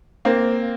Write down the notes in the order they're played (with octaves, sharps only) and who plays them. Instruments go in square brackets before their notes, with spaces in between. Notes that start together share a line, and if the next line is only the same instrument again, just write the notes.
[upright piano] A#3 C4